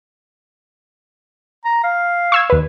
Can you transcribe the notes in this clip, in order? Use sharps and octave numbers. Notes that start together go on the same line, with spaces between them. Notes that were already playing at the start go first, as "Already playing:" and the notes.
A#5
F5
C#6 E6 G#6
D#2 B4